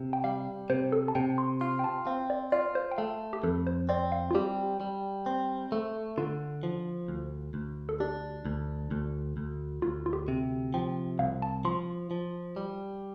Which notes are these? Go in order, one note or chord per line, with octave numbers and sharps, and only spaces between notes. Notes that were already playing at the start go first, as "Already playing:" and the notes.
Already playing: C3
G5
G3 F5
C3 C5
A4
A5
C3 G5
C6
F4 C6
G5
A5
C4 F5
D5
F4 D5
C5
G5
A3 F5
G4
F2 A4
C5
C4 D5
F5
F4
G3 G4
G3
C4
A3
D3 F4
F3
D2
D2
A4
D4 G4
D2
D2
D2
D2 F4
F4
G4
C3
F3 G5
C2 F5
A5
F3 C6
F3
G3